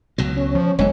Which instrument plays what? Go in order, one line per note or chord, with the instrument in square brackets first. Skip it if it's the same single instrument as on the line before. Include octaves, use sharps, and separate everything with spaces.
[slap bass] C#2 B2 F#3
[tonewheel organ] C#4
[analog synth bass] F3
[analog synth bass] G1 [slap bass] F#2 D3 [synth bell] G#3 C#5